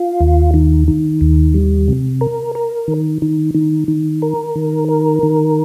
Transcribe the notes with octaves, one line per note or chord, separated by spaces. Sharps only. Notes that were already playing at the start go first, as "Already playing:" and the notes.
Already playing: F4
D#2
D#3
D#3
D#2
G3
C3
A#4
A#4
D#3
D#3
D#3
D#3
A#4
D#3
A#4
D#3